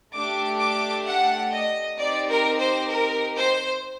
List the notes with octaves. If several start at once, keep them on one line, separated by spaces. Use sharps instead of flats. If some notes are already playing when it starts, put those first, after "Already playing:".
A3 D4 G4 D6
D6
F#5
D#5
C4 D#4 G4 D5
A#4
C5
A#4
C5